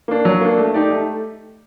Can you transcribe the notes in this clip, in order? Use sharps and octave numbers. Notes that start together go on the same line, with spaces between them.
A#3 D4
F#3
A#3 D4
A3
D#4 G4 D5
A3